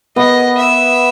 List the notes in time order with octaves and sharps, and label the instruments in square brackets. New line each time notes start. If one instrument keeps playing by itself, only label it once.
[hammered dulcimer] B3 [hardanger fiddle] D#5
[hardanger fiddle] E5